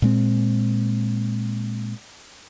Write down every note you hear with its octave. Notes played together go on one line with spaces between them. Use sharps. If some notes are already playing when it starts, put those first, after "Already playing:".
A#2 G#3 C4